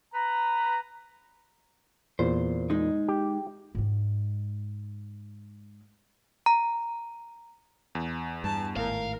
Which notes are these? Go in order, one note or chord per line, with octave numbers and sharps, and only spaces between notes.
B4 A#5
E2 A#2 C5
G#3 D#4
G4
G#2 G#3
A#5
E2
G2 A5
G#1 A2 A#4 F5